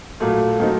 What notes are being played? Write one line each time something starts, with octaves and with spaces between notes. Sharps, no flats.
A#2 F#3 A3
D#3 F#3 A3 C4 D#4